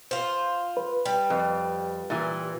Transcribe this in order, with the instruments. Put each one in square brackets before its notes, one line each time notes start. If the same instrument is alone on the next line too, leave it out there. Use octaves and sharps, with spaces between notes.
[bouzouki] F4 C5
[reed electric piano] B4
[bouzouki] G3
[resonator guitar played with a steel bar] F2
A#2 E3